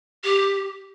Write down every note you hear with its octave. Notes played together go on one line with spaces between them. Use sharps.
G4